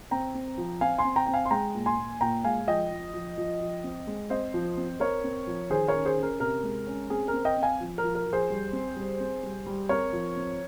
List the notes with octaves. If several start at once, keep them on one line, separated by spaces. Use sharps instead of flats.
C4 G5 A#5
C4
F3
C4 F5 G#5
G#5 C6
C4
G5 A#5
C4 G5
F5 G#5
C6
G#3 G5 A#5
A#2
G#5 C6
A#2
A#2 G5 A#5
G#3 F5 G#5
F3 D#5 G5
F3
F3
F3
F3
C4
G#3
C4 C5 D#5
F3
C4
C4 A#4 C#5
C4
F3
D#3 G#4 C5
A#4 C#5
C#4
G#4 C5
C#4
A#4
C3 A#4
G#3
C#4
C4 G#4
A#4
C4
D#5 G5
C4
F5 G#5
F3
A#4
F3
A#4
F3
G#4 C5
G3
C4
G3
C4
G3
G3
C4 A#4 C#5
F3
C4